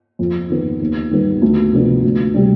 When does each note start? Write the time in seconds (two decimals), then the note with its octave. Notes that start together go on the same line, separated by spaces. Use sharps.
0.19 F2
0.50 D#3 B3
0.80 D#2
1.11 D#3 G3 B3
1.42 D2
1.73 C3 F3 B3 D4
2.04 D2
2.34 C3 G3 D4